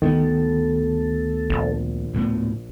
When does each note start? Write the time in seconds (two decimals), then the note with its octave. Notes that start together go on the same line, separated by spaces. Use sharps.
0.02 D2 D#3 A#3 B3 A4
1.50 A#1
2.14 D2 A2 B3